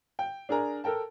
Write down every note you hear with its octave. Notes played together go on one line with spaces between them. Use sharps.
G5
D4 G#4 A#4 A#5
A4 A#4 G5 A5